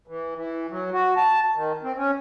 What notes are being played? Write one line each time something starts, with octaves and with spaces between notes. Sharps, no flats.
E3
E3
F#3
F#4
A5
D#3
C4
C#4